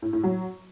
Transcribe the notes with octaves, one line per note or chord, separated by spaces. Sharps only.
A2
A2
F#3